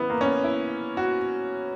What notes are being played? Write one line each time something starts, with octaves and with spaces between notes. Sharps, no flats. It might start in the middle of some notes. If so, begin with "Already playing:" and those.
Already playing: C#3 E3 G3 B3 E4
A#3
C#4
B3
E4
F#4